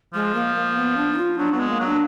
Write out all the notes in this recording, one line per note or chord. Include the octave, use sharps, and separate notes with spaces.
F3 G#3
A#3
A#3
B3
D4
D#4
F4
F#3 D4
F#3 B3
G#3
A#3
F#3
D4